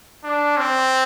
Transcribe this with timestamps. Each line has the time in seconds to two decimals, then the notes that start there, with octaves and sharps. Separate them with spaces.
0.24 D4
0.58 C4